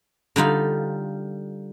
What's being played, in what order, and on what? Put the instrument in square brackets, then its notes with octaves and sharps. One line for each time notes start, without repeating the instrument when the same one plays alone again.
[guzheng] D3 G3 D#4 F4